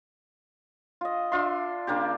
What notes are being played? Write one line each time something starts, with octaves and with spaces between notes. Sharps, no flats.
F4 D#5
D4 F4 E5 C6
C#3 A#3 D4 G4